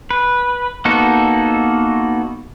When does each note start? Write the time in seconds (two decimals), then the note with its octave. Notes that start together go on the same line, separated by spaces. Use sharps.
0.11 B4
0.85 A#3 B3 D#4 F#4 A4